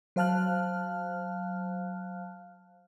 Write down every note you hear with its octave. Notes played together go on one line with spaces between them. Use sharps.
F#3 C5 F5 A5 F6 F#6